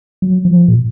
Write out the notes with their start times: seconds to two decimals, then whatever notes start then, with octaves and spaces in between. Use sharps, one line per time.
0.22 F#3
0.45 F3
0.68 A#2